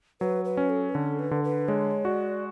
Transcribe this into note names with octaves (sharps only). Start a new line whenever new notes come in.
F#3 B4
B4
C#4
A4
B4
D3 A4
B4
D3
B4
G#3 C#5
F#4 D5